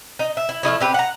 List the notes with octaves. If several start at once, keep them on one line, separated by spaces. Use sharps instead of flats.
D#4
E5
E4
F3 A3 D#4 E4
C4 G4 B4
F#5 A#5